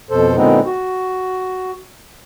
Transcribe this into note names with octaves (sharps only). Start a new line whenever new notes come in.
F2 B2 A4 C5
A#2 D3 G#3 B3 C4 D#4
F#4